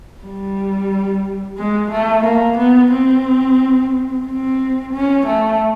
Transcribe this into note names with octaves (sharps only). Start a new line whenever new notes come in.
G3
G#3
A3
A#3
B3
C4
C4
C#4
A3